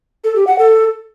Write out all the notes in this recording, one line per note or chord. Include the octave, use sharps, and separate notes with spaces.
A4
G4
F#5
A4